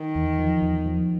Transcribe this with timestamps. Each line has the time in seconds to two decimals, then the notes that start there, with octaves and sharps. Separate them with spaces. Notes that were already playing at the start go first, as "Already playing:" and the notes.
Already playing: D#3
0.15 E2
0.38 F3
0.62 E2
0.86 F3